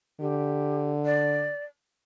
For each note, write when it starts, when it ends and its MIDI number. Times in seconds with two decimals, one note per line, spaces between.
0.20 1.50 50
0.20 0.91 67
1.05 1.64 74